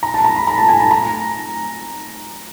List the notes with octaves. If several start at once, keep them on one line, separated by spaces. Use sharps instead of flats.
A#5
A5
A#5
B5
A#5
A5
G#5
A5
A#5